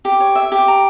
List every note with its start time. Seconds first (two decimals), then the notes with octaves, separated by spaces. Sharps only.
0.05 G4
0.20 C#5
0.35 E5
0.52 G4
0.68 A#5